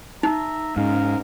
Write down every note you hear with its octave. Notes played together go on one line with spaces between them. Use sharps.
D#4 E5 A#5
G#2 C#4 A#4 F5